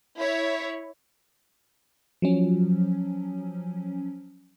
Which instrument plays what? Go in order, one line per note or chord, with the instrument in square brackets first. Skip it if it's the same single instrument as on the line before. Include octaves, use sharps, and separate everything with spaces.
[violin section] E4 C#5
[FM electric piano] F3 F#3 C#4